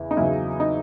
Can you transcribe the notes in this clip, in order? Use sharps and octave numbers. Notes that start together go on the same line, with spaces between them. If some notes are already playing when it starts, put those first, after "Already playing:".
Already playing: E2 C#3 E4
D#4
E2 C#3 F#3 E4
D#4